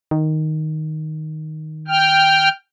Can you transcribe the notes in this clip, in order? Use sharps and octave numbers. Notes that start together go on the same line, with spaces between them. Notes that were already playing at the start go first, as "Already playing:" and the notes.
D#3
G5 F6